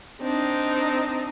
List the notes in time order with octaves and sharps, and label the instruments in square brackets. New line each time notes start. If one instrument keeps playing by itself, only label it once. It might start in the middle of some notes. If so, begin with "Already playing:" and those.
[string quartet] C4 D4 D#4